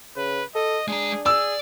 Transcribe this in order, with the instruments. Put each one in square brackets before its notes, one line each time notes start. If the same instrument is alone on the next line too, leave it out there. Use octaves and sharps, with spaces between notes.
[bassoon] C#3 [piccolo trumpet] B4
[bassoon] A4 [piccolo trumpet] D#5
[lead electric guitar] G#3 A#5 [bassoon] D4 [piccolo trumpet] G#4
[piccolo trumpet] G#4 [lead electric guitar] D5 [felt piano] E6